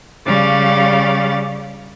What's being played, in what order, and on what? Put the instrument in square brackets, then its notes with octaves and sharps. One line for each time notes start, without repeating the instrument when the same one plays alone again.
[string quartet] C#3 G3 C#4 D5 F5 A6